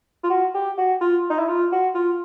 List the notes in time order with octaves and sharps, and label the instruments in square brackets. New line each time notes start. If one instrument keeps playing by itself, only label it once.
[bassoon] F4
F#4
G4
F#4
F4
D#4
E4
F4
F#4
F4